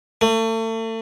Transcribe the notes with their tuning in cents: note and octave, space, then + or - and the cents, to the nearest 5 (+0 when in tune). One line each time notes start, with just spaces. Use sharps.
A3 +35